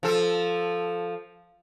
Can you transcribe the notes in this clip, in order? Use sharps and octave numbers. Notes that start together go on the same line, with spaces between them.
F3 A4